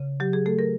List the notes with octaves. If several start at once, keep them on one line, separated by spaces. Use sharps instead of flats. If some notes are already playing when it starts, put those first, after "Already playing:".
Already playing: C#3
F#3 G4
G#4
A3 A4
A#4